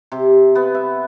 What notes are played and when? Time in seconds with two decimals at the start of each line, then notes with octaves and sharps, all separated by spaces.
0.12 C3
0.55 B3
0.75 E5